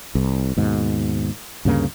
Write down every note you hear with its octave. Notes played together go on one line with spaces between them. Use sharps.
C2
D#2 G#2 B2
D2 G2 C#3 A#3